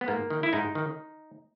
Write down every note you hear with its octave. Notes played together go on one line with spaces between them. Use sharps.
B3
G#2 A#3
D#3
E4
G#2 D#4
D#3